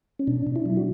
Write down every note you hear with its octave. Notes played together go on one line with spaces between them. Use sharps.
C#4
B2 D4
B2
D4 E4
F#3
F#4